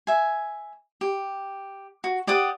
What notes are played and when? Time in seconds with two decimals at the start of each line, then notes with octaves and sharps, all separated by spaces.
0.07 E5 G#5
1.01 G4
2.04 F#4
2.27 G4 D5 F#5 D#6